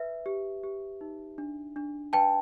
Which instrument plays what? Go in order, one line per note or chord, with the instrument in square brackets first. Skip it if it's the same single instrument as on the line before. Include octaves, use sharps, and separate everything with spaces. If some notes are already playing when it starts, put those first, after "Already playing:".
Already playing: [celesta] B4 E5
G4
G4
D#4
D4
D4
B4 G5 A5